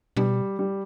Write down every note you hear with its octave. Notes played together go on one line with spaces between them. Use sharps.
B2 G3
G3